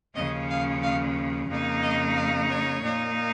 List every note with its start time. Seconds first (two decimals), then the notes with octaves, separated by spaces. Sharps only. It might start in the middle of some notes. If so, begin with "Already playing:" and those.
0.16 D#2 C#3 F3 C#4 D#5
0.50 F5
0.82 F5
1.50 F2 C#3 A#3 D#4
1.82 D#5
2.15 F5
2.49 C#5
2.83 A#2 A#3 D#4